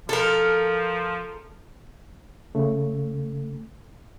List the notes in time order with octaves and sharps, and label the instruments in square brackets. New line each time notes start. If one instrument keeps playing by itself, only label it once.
[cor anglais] F3 [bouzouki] A4 A#4
[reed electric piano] C#3 A3